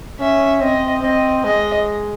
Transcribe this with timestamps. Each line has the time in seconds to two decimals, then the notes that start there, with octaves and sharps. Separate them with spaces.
0.19 C#4 E5
0.61 C4 D#5
1.02 C4 D#5
1.44 G#3 D#5